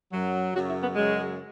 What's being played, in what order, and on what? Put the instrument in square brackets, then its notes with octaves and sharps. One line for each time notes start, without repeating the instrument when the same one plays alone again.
[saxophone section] F#2 F#3
F#2 C#3 F#3 F#4
E4
B3
F#2 C#3 F#3 G#3